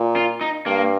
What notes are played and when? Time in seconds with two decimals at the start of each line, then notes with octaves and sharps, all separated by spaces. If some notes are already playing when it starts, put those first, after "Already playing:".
Already playing: A#2
0.16 F4
0.41 D#4
0.66 G2 A#3